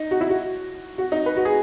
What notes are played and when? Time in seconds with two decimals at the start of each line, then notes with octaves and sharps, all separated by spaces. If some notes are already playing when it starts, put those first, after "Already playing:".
Already playing: D#4
0.11 F#4
0.21 E4
0.30 F#4
0.98 F#4
1.12 D#4
1.26 B4
1.37 F#4
1.45 G#4